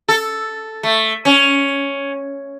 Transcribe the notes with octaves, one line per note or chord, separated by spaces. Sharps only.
A4
A3
C#4